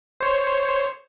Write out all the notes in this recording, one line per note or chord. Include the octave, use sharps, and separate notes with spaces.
C5 C#5